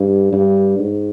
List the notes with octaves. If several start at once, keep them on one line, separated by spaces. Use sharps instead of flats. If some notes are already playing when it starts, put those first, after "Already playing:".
Already playing: G2
G2
G#2